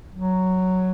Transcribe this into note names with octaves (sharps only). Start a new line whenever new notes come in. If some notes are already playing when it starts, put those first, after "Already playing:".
F#3